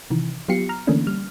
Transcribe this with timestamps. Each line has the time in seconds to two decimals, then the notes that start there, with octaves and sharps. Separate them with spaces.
0.10 C3 D#3 E3
0.49 F#3 B3 F4 G4 C7 C#7
0.69 A#5 F6
0.87 D3 E3 A3 A#3 C#4 D4
1.07 G3 F6